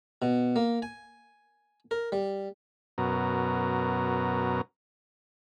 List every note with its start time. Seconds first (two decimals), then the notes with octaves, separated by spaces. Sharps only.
0.22 B2
0.56 A#3
0.82 G#5
1.91 A#4
2.12 G3
2.98 F#2 B2 A#4